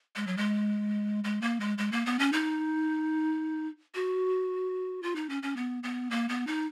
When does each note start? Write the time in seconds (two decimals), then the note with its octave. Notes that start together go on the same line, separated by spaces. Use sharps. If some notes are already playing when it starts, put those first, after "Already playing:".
0.16 G#3
0.27 F#3
0.37 G#3
1.24 G#3
1.42 A#3
1.60 G#3
1.78 G#3
1.92 A#3
2.06 B3
2.19 C#4
2.33 D#4
3.95 F#4
5.03 F4
5.16 D#4
5.29 C#4
5.43 C#4
5.56 B3
5.83 B3
6.11 A#3
6.29 B3
6.47 D#4